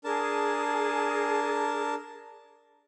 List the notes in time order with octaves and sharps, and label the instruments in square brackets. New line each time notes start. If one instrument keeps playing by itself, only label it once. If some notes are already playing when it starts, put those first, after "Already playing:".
[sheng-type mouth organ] D4 A#4 A5 [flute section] G#4